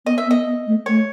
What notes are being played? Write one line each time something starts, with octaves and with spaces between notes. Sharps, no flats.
B3 D#5
E5
B3
D#5
B3
A3
A3 C#5